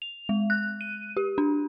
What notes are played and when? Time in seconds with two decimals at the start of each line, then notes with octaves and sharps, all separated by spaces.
0.02 F7
0.29 G#3
0.50 F#6
0.81 D#7
1.17 G4
1.38 D4